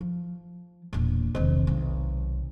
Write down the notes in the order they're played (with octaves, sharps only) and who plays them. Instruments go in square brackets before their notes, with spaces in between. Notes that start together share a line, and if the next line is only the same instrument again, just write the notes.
[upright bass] F3
E1 A#2
[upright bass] E1 B1 [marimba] C3 D#3 C4
[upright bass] B1